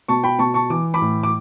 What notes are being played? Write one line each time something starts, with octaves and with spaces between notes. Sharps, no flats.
B2 A5 C#6
G5 B5
B2 A5 C#6
A5 C#6
E3 D6
B5 D6
A2
D6